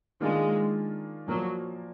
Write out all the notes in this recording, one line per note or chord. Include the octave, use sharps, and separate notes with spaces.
D#3 G#3 A#3 D4 F4 G#4
A#2 F3 F#3 A#3